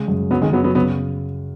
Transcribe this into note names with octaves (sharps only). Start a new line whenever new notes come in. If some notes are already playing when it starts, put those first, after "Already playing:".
Already playing: C#3 G#3
F#2
C#3 F#3 B3
D#3 G#3
F#2 F#3 B3
F#3 B3
C#3 F#3 B3